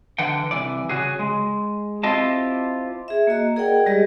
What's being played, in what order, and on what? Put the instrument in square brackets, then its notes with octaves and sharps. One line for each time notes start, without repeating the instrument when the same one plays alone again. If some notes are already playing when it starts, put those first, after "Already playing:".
[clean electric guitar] D3 E3 F#5 G5
C2 E3 D5
C#3 F#4 G#4
G#3
C4 E4 F4 G4 D#5 A5
[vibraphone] G#4 E5
A#3 F#4 D#5 A#5
G#4 A#4 D5 D#5 F#5 G5
G3 G#3 G4 G#4 D#5